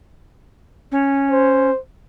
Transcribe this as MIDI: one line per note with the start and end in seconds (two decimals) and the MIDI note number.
0.92 1.71 61
1.31 1.78 72